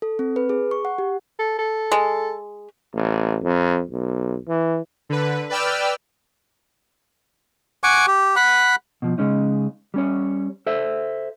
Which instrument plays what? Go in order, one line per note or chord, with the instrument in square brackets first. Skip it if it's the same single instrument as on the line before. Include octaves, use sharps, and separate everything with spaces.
[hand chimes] A4
C4
B4
G#4
C#6
F#5
G4
[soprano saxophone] A4
A4
[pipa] G#3
[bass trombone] A1
F2
B1
E3
[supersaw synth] D3 B4
B4 D5 G5 E6 F6
[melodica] F#5 G#5 C#6 D6
G4
F#5 B5
[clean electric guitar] B2 F3
C#3 G#3 C#4 D#4
G3 C#4 C#5
A4 C5 E5